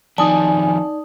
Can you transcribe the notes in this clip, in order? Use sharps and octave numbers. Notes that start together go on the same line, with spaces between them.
F2 D#3 D#4 D5 G#5 A5 D#6